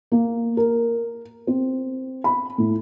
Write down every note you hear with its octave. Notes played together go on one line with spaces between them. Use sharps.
A#3
A#4
C4
B5
A2